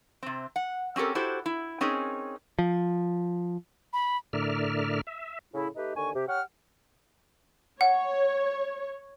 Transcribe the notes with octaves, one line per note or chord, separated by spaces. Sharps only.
C3 C4
F#5
C4 C#4 G4 A4 A#4
E4 F#4 G4 A4 C5
E4
C4 C#4 D#4 G#4 A#4
F3
B5
A2 D3 A#4 D5 E5 F6
E5
A2 C#3 E4
A3 D#4 G4 B4
D#2 D3 G#5 C#6
C3 G4
G4 C#5 F#5 F6
C#5 F#5